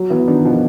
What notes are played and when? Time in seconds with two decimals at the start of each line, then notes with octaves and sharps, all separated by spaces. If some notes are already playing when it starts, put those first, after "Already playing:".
Already playing: F#3
0.10 E3 B3
0.27 D#3 D4
0.45 B2 F3